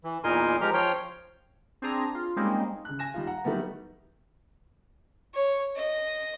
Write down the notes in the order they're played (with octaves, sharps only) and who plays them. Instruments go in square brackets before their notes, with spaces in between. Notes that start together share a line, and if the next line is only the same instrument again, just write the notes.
[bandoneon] E3
E2 A#2 D#4 A#4 G#5 C6
F3 G#3 G4 A#4 A#5
F3 C#5 G5 C6 F6
[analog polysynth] C4 D4 G#4 A#5
F4
G3 G#3 A#3 C4 C#4 D#4
[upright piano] C#3 F#6
G#5 A#6 E7
G3 D#4 F4
F#5 A#5
D#3 F#3 G3 A3 B3
[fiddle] C#5
D#5